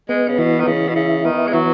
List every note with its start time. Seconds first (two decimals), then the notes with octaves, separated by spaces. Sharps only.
0.09 G#3 B3
0.28 C#3
0.38 B2 E3
0.60 D#3
0.67 C#3 E3
0.88 B2
0.96 C#3 E4
1.25 D#3 B3
1.47 G#3
1.53 E3 F#3